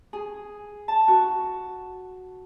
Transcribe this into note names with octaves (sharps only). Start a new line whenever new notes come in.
G#4
A5
F#4